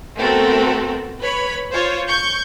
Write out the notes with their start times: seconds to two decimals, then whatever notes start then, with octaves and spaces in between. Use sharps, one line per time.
0.19 A3 B3 C4 F#4 A4 A#4
1.20 B4 C#5 B5
1.72 F4 C5 C#5
2.08 C#6 G6